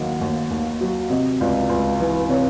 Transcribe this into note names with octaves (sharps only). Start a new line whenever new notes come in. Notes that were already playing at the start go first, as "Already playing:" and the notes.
Already playing: D#2 D#3 F#3 F5 F#5
D#2
D#2
F#3
C3 D#5
C#2 D5
C#2
E3
C3 C#5